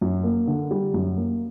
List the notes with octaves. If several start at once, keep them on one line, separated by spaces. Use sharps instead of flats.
F#2
A#3
D3
G3
F#2
A#3